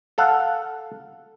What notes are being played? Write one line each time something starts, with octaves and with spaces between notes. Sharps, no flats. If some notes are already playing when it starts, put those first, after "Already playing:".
A4 F5 F#5